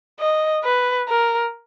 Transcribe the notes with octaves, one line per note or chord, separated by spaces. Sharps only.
D#5
B4
A#4